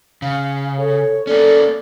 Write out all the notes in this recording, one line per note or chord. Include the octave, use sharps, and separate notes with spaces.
C#3 F5
A4 C#5
A#3 C#4 A4 D5